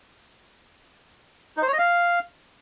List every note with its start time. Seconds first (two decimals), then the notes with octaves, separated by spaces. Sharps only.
1.57 D#4
1.62 C5
1.68 C#5
1.73 D#5
1.78 F5